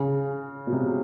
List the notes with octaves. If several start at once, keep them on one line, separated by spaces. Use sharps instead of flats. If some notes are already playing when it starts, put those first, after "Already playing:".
Already playing: C#3
B2
C3